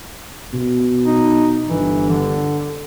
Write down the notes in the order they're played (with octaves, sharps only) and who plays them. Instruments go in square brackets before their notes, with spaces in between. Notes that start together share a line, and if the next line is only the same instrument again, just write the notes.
[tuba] B2
[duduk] D#4
[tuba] G1 [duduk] E3
[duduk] D3